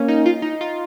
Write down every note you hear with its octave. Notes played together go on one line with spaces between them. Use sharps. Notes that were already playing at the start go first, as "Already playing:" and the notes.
Already playing: A#3 C#4
D#4
F4
D#4
F4